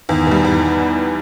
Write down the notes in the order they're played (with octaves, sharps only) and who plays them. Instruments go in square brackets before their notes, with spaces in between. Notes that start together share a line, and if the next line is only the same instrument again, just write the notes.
[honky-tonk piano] E2 [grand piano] D#3
[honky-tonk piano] B2 G3
E2